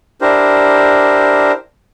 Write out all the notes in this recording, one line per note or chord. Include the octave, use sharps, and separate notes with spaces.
D4 E4 G4 A#4 C5